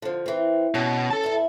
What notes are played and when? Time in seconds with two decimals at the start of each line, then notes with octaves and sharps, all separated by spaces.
0.02 D3 F3
0.26 E3 C4
0.75 B2 C#4
1.10 A4 A5
1.23 E2 E4